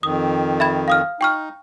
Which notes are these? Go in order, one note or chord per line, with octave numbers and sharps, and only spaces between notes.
F2 D#3 D#6
E5 B5 G#6
F5 D#6 F6
D#4 G5 C#6 F6